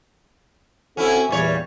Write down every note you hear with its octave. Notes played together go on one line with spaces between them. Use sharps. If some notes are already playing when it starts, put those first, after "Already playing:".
C4 C#4 E4 F#4 A4
E2 A#2 E3 G3 C#5